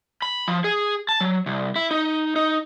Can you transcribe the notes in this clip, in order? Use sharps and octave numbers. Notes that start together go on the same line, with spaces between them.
B5
F3
G#4
A5
F#3
C2
E4
D#4
D#4